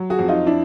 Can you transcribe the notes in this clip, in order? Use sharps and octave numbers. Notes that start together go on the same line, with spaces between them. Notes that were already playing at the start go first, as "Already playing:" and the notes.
Already playing: F#3
F#4 G#4
F2
D#4 F4
D4 E4